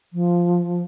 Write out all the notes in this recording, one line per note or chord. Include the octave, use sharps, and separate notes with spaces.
F3